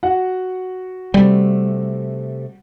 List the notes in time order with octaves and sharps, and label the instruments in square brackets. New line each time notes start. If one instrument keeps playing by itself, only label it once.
[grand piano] F#4 F#5
[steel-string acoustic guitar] C3 A3 [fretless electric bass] G3